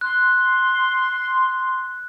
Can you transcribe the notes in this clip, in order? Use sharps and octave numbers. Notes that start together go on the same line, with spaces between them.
C6 F#6